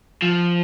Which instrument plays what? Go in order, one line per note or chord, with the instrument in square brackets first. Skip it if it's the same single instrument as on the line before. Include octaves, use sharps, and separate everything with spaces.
[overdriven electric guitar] F3